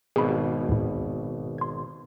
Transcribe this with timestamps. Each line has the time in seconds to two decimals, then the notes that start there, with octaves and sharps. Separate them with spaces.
0.16 G#1 B2 G#4 B5
0.69 D2 A2
1.58 C6 G#6